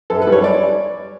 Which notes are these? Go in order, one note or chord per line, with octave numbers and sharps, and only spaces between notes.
F#2 A4
B4
G3
C#5
D5